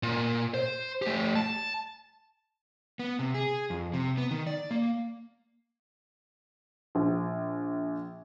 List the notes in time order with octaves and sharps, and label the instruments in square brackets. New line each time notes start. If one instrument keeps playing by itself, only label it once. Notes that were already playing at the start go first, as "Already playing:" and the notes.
[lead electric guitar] A#2
C5
A3 G4
A5
[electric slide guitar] B3
C3
G#4
F2
C3
B3
D#3
D5
A#3
[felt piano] A#1